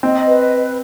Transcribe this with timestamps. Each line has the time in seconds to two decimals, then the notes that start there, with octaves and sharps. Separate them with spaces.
0.03 C4 D#5
0.27 B4